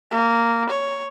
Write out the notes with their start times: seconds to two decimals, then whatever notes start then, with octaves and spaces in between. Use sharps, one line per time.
0.11 A#3
0.70 C#5